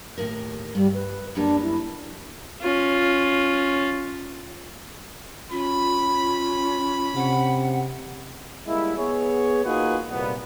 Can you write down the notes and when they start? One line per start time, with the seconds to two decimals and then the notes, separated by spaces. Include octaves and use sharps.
0.18 D#2 A2 A#4
0.75 G2 G3
0.94 B4
1.35 F#2 G3 A#3 D4
1.62 E4
2.61 C#4 F4
5.51 C#4 F4 B5
7.16 C3 F#5
8.66 G3 G#3 A#3 E4
8.97 B3 G#4 C#5
9.64 A#3 D#4 F4 F#4 G#4 B4
10.09 C2 A#2 B3